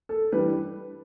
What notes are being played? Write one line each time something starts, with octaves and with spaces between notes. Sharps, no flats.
A4
E3 G3 D4 B4